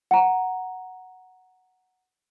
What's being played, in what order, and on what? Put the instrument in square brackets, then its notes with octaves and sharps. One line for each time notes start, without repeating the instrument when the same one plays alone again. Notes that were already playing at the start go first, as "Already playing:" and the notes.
[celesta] F#5 A#5